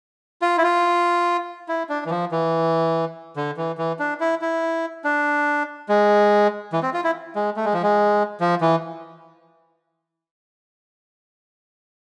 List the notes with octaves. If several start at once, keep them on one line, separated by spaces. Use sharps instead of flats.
F4
E4
F4
E4
D4
E3
F3
E3
D3
E3
E3
D4
E4
E4
D4
G#3
E3
C4
F4
E4
G#3
A3
G#3
F3
G#3
F3
E3